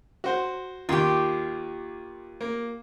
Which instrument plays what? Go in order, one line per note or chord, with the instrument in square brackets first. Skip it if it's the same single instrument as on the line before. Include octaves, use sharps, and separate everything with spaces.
[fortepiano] F#4 C5
[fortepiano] D#2 [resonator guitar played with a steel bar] F4 G4
[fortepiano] A#3